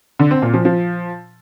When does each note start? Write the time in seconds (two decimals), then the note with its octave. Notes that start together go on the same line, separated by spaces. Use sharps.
0.19 D3
0.31 C4
0.42 A#2
0.54 F3
0.65 F3